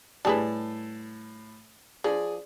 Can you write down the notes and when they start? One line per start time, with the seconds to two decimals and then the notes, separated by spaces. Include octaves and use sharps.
0.25 A2 G3 G#4 B4 A5
2.04 F3 G#4 D5